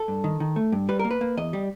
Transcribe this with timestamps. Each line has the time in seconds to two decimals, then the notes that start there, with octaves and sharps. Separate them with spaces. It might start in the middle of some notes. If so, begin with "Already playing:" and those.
Already playing: A4
0.08 G2
0.24 D#3
0.40 D#3
0.56 A3
0.72 G2
0.89 G3 B4
0.99 A#4
1.05 A#3
1.11 B4
1.21 A#3
1.37 E2 D#5
1.53 G3